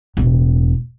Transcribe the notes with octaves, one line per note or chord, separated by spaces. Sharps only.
E1 A2